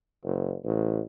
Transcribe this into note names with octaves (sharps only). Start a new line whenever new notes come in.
F#1
A1